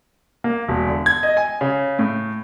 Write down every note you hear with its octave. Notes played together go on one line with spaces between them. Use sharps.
A#3
E1
D3
G#6
D#5
G#5
C#3
A2